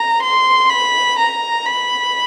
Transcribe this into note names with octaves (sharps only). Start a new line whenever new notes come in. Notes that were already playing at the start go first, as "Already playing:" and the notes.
Already playing: A#5
C6
B5
A#5
B5